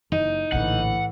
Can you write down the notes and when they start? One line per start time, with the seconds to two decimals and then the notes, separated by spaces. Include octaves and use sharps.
0.12 F#1 D#4
0.52 A#1 A2 D3 E3 F#5